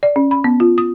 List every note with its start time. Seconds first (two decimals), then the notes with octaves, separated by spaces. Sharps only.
0.03 D5
0.16 C#4
0.31 B5
0.44 B3
0.60 F4
0.78 D#6